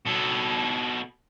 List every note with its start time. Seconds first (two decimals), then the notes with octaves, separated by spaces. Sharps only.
0.05 B2 A4